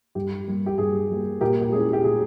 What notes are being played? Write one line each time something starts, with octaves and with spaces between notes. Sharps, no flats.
G2 G4
G3 A#3
G4
G2 G#4
G3 A#3
A#2 G4 A#4
G4
G#3 C#4 E4 G#4
G4
A#2 G#4